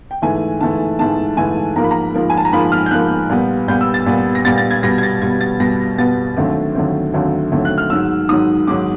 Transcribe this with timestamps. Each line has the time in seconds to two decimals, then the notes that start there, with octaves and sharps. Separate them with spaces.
0.11 G5
0.22 G#2 E3 A3 G#5
0.61 G#2 E3 A3 A5
0.99 G#2 E3 A3 A5
1.37 G#2 E3 A3 G#5
1.76 G#2 F3 A#3 A#5
1.84 B5
1.91 A#5
2.15 G#2 F3 A#3
2.30 G#5
2.37 A5
2.45 A#5
2.53 G#2 F3 A#3 B5
2.72 F6
2.86 G6
2.91 G#2 F3 A#3 F#6
3.30 A#2 G3 B3
3.68 A#2 G3 B3 G6
3.81 E6
3.94 A6
4.06 A#2 G3 B3
4.35 A#6
4.45 A#2 G3 B3 A6
4.58 A6
4.71 G#6
4.83 B2 G3 B3 A#6
4.98 G#6
5.03 A6
5.22 B2 G3 B3 G#6
5.41 A6
5.60 B2 G3 B3 A#6
5.98 B2 G3 B3 A6
6.37 D#2 D3 F#3 A3 C4
6.75 D#2 D3 F#3 A3 C4
7.13 D#2 D3 F#3 A3 C4
7.52 D#2 D3 F#3 A3 C4
7.65 F#6
7.78 F6
7.90 G#2 D#3 F#3 E6
8.29 G#2 D#3 F#3 D#6
8.67 G#2 D#3 F#3 D6